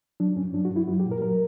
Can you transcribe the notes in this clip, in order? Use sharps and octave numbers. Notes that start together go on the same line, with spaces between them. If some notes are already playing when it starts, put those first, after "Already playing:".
F#3 D4
G2 C#4
F#3 D4
F#4
G2
E4
F#3 F#4
G4
A#2
A#4
F#3 A#4